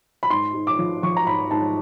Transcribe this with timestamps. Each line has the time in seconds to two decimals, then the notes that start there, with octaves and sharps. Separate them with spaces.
0.23 B5
0.30 G#2 C6
0.54 G#2
0.67 D6
0.79 F3
1.03 F3 C#6
1.17 A#5
1.26 G#2 B5
1.51 G#2 A5